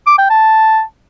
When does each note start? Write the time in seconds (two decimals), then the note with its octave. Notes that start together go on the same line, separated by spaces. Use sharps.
0.07 D6
0.18 G5
0.30 A5